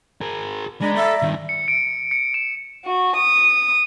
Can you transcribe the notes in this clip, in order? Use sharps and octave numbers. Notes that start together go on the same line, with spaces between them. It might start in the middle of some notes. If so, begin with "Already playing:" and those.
G#4 A#4
G#3 D4 D5 A#5 B5
A4 E5
G2 D#3
C#7
D7
C#7
E7
F#4
D#6